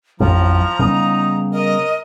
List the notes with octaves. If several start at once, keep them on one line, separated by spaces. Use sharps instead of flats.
A1 F2 F3 F#3 A#5
C#3 G3 B3 D#4
A#4 D#5